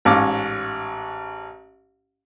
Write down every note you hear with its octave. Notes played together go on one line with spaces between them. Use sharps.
A1 G#2 C#4 F5 D6